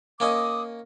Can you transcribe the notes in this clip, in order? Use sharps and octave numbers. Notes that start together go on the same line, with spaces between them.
A#3 C#4 D#5 D6 D#6